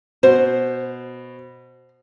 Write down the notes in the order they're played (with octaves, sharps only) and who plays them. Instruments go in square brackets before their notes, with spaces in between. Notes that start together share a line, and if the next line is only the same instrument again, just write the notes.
[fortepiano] B2 [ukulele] C5